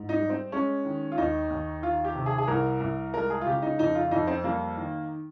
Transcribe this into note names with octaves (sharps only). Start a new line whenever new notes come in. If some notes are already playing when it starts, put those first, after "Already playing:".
Already playing: G#2
D#4
G3
C4
G#3 C#4
D#3
F4
D#2 D#4
D#2
D#3 F4
G4
C3
G#4
G#4
C2 A#4
C2
G#3 A#4
G#4
F4
C#3 G4
D#4
F2 D#4
F4
F2 D#4
C4
G3 A#3
D#3